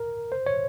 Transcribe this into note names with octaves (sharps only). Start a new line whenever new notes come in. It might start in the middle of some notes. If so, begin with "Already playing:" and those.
Already playing: A#4
C5
C#5